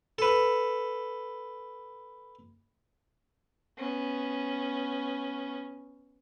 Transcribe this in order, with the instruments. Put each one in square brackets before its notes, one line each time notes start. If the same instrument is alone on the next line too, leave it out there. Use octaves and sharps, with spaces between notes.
[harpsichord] A4 B4
[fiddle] B3 C#4